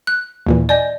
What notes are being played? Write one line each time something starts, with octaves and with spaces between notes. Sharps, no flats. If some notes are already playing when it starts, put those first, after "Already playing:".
F#6
D#2 A#2 E3
D5 D#5 G#5 G6